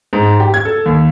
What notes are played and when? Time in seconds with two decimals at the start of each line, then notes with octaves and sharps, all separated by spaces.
0.13 G#2
0.40 G4
0.54 G#6
0.65 A4
0.86 D#2